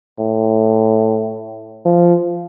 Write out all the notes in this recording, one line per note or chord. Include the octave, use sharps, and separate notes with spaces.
A2
F3